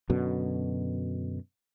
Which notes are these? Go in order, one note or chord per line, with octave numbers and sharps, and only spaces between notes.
F#2 B2 D3